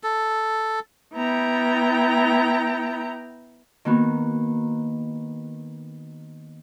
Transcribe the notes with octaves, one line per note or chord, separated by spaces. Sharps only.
A4
B3 E4 G5 A#5
D#3 A#3 B3 F#4